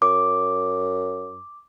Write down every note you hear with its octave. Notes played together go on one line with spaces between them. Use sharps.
F#2 D6